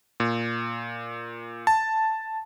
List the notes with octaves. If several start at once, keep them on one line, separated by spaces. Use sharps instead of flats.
A#2
A5